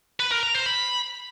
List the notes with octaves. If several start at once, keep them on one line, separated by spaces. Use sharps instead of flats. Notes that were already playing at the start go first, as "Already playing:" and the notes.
B4
A#4
A#5
C5
B5